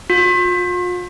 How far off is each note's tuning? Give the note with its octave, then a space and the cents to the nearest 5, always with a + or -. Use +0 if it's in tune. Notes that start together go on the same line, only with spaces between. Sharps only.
F4 +40